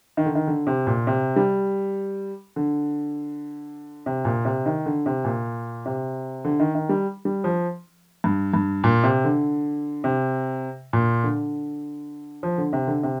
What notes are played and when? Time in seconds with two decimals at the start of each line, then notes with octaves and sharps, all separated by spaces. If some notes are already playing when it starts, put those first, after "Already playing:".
0.17 D#3
0.26 D3
0.35 D#3
0.47 D3
0.67 C3
0.87 A#2
1.07 C3
1.36 G3
2.56 D3
4.06 C3
4.25 A#2
4.45 C3
4.66 D#3
4.86 D3
5.06 C3
5.25 A#2
5.86 C3
6.45 D3
6.60 D#3
6.75 D#3
6.89 G3
7.25 G3
7.44 F3
8.24 G2
8.54 G2
8.84 A#2
9.03 C3
9.24 D3
10.04 C3
10.93 A#2
11.23 D3
12.43 F3
12.58 D3
12.73 C3
12.87 D3
13.03 C3